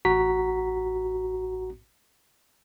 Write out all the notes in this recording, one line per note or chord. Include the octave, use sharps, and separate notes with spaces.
A1 F#4 A#5 B6